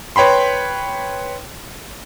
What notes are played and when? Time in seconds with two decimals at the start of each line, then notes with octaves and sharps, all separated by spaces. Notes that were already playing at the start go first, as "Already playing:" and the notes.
0.16 B4 C#5 G5 B5 C6